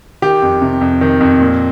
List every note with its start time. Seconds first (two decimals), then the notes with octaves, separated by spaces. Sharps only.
0.22 D#3 G4
0.42 F2
0.61 C3
0.81 F2
1.01 D#3
1.21 F2
1.40 A#2